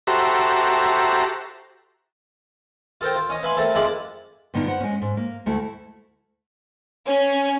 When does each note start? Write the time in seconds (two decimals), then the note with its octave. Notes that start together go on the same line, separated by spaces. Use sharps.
0.07 F#4 G4 A4 C5 E5 A#5
3.01 F4 A4 A#4 C5 G5
3.15 F4
3.29 C#4 D#5
3.43 B4 E5 F5 G#5 B5 C6
3.56 A3 C4 A4 A#4
3.75 F2 G#3 E4 F4 B5 D6
4.54 G2 D3 B3 D#4 F4
4.68 C5 F#5
4.81 G#3 C#4
5.02 G#2
5.17 A#3
5.46 D2 A3 E4 F#4
7.07 C#4